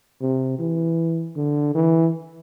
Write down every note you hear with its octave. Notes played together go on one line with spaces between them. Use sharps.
C3
E3
D3
E3